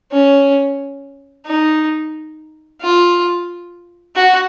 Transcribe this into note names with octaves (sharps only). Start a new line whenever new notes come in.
C#4
D#4
F4
F#4